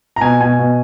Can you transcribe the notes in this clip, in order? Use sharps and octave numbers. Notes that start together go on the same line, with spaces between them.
A#5
B2 G#5
B2 G#5
B2